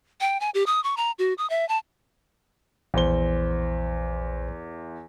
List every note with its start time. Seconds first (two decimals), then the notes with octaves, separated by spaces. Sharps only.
0.20 G5
0.40 G#5
0.54 G4
0.66 D#6
0.84 C#6
0.97 A#5
1.19 F#4
1.38 D#6
1.50 E5
1.69 A5
2.94 A#1 E2 C5 G7